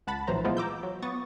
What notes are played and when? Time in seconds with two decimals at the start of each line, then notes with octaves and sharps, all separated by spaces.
0.07 C#2 F#5 A5 B5 A6
0.27 A#1 A2 E3 F#3 C5 A#5
0.44 F3 G#3 B3 E4 F4 C5
0.57 A#5 D6 E6 G6
0.83 F#3
1.02 B3 C#6 D#6 A6